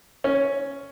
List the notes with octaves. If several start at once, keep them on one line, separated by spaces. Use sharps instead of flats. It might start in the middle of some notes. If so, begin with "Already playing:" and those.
C#4